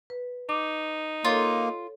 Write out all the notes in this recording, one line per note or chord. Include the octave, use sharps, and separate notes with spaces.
B4
D#4 D6
A#3 F4 A4 C#5